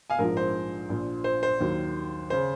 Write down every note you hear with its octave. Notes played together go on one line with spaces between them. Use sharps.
F5 G#5
A#1 G#2 F3 A#4
C5
A#1 A#2 F3
C5
C5
D#2 D#3 F#3
C#3 C5